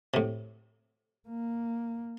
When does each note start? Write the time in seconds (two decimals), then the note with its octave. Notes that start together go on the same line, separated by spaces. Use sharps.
0.14 A2 C3
1.28 A#3